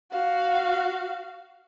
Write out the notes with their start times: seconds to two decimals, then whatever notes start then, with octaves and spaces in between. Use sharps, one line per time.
0.12 F#4 F5